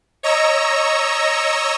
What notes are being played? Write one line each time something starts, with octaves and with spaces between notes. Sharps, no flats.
C#5 D#5 A#5 C#6 E6